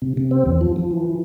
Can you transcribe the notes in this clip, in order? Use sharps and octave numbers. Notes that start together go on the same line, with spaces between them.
C3
C3
C4
E2
F3
F3
E3